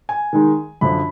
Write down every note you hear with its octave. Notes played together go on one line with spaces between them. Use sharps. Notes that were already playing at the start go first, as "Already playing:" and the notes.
G#5
D#3 G#3 D#4
F#2 D3 F3 B5